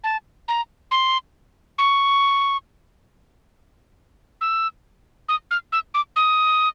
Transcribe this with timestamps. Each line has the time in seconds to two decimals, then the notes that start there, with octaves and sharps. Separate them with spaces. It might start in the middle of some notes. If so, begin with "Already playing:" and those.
0.04 A5
0.48 A#5
0.91 C6
1.78 C#6
4.41 E6
5.29 D#6
5.51 F6
5.72 E6
5.94 D6
6.16 D#6